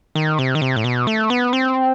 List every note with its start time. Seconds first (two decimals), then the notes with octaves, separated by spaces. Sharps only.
0.15 D#3
0.39 C3
0.55 D#3
0.62 C3
0.76 A2
0.84 B2
1.07 A3
1.30 B3
1.53 C4